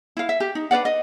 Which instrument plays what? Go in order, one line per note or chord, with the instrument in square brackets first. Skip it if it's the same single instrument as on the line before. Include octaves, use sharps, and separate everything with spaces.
[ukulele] E4 F5
E5
G4
D#4
D4 B4 D5 F#5
D#5